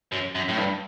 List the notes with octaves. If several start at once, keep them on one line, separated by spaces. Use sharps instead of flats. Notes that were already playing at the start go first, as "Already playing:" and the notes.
F#2
F#2
A2
G2